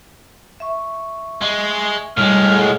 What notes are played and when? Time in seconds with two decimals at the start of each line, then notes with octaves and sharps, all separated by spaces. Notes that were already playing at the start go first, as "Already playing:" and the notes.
0.60 E5 C#6
1.42 G#3
2.17 A2 G3 G#3 F6
2.49 G#4 A4 F#5